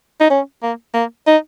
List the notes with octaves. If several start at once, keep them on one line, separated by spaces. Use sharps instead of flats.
D#4
C#4
A#3
A#3
D#4